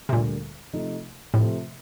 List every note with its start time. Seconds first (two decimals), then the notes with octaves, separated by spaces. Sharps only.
0.09 C3
0.12 D2 A#2 D3 G3 A#3
0.73 C3 F3 A3 D#4
1.34 A2 C3 F3 A3